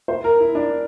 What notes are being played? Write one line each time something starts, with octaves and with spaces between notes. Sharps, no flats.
C5
A#4
E4
D4